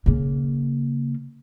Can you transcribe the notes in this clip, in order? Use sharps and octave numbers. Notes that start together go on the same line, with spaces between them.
C#3 A#3